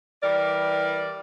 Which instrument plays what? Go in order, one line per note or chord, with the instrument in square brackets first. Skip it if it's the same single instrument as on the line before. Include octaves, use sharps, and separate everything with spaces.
[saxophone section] E3 G3 A#4 D5